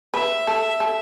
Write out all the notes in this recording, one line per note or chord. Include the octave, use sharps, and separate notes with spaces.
B4 E5
A4
A4